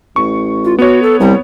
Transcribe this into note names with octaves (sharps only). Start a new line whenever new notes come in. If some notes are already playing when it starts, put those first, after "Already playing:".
A1 C#6
F4
B3 F#4 C#5
A4
C2 G3